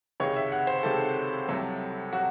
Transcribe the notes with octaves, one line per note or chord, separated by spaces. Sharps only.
C#2 C3 D#3 G#3 C#5
E5
F#5
C5
C#2 C3 D#3 G#3 A4
C2 C3 F#3 A3
C3 F#3 F#4